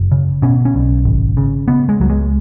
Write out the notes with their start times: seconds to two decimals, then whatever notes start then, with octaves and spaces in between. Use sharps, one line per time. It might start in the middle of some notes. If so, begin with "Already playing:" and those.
Already playing: F#1
0.11 C#3
0.42 B2 C#4
0.65 C#4
0.74 B1
1.05 G#1
1.37 C#3
1.68 C#3 B3
1.89 G#3
2.00 C#2 F#3
2.10 G#3